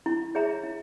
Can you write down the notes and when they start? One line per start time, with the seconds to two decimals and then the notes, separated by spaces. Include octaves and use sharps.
0.06 E4
0.35 G#4 C#5 E5 A#5
0.63 E4